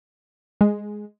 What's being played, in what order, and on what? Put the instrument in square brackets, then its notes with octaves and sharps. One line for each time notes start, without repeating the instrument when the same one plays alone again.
[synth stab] G#3